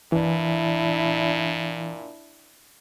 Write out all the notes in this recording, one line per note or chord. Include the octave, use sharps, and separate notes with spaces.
A#2 E3 D4 E4